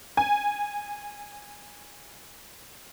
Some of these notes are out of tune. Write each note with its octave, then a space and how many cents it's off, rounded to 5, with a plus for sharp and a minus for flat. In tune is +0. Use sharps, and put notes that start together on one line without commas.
G#5 -15